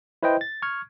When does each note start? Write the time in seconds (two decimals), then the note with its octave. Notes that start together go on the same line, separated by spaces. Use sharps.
0.23 E4 B4 C5 D#5 G5
0.41 A6
0.62 C#6 F6 G#6